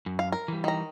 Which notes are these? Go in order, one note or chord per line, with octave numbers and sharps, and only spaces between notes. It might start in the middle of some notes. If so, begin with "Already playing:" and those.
F#2
F5
A#4
E3 G3
D#3 A#5